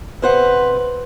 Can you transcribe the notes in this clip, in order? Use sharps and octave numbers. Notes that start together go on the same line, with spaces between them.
C3 B4 C5 F#5